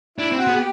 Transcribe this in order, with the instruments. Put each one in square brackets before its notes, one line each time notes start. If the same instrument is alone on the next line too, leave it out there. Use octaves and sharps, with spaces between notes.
[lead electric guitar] D4 [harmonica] E4
[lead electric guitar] C4
[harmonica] F#4
[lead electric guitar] B3 [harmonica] G#4
[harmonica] G4